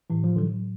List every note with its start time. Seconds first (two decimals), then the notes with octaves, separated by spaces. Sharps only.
0.10 A2 E3
0.24 F3
0.36 D3 E3 F#3